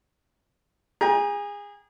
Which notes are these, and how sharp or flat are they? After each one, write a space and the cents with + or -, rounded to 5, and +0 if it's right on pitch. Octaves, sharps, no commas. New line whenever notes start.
G#4 -25 G5 +0 A#5 +25